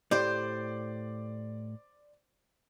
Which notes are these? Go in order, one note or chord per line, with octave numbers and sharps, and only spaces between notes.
A2 G4 C5 D5